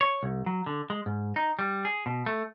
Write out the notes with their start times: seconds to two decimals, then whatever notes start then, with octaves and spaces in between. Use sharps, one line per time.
0.01 C#5
0.23 C2
0.46 F#3
0.66 D3
0.90 G#3
1.06 G#2
1.36 D#4
1.59 G3
1.85 G#4
2.06 B2
2.26 A3